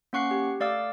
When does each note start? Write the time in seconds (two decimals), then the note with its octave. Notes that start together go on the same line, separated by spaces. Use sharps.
0.13 A#3 C#4 F#5 C#6 F#6 C7
0.31 G4
0.60 A3 D5 F5 D6 E6 A6